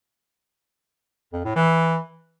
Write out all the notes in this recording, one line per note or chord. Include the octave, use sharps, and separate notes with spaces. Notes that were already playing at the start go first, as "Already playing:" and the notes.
F2
A2
E3